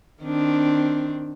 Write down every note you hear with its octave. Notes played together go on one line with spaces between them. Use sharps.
D#3 C4 D4